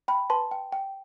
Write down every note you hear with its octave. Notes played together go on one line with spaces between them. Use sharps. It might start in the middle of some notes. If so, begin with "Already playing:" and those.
G5 B5
B4 A5 C6
G5
G5